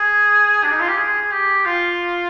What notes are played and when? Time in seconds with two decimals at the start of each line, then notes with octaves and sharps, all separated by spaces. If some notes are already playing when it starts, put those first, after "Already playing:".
Already playing: G#4
0.64 D4
0.71 D#4
0.80 F4
0.88 G4
0.97 G#4
1.21 G#4
1.31 G4
1.66 F4